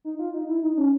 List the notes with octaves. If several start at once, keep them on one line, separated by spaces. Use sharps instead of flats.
D#4
F4
D#4
E4
D#4
C#4